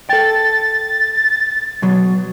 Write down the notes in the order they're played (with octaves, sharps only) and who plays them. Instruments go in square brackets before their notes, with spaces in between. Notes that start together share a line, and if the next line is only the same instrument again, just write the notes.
[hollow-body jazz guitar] A4 G5 [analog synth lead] A6
[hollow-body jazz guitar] B2 F#3